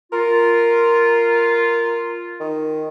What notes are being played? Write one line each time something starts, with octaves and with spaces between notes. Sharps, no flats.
F4 A#4
D#3